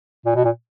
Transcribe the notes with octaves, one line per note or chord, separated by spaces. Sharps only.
A#2
B2
A#2